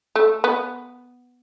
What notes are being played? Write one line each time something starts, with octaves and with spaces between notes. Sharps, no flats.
A3
B3